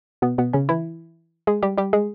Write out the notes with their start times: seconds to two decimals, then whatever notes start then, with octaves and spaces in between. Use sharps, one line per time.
0.22 B2 B3
0.38 B2 B3
0.53 C#3 C#4
0.69 E3 E4
1.47 G#3 G#4
1.63 G3 G4
1.77 G3 G4
1.93 G#3 G#4